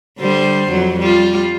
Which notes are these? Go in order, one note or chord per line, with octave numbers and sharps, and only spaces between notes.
D3 G3 C5
F2 F#3
G3 F4